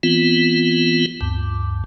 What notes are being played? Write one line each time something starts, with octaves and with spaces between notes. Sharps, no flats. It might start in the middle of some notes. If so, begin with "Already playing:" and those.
E3 B3 C4 F4
D2 G2